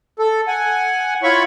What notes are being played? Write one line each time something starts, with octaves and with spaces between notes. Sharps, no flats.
A4
F#5 G#5
E4 F4 C#5 B5 C#6